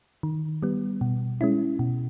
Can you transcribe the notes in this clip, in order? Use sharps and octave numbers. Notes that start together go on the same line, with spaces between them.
D#3
G3 B3
B2
G#3 C#4 E4
B2